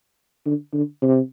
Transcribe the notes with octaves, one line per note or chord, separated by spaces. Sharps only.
D3
D3
C3